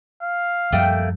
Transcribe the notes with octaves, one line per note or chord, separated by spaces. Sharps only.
F5
F#2 F3 G3 A3 A#3 G5